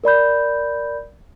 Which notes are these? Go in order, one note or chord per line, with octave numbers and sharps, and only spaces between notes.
A#4 D5 B5 G6